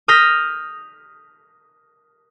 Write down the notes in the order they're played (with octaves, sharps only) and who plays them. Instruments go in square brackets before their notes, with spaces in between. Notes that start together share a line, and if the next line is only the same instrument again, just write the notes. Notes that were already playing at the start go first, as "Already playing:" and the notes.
[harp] D#6 F6 G6 A#6 B6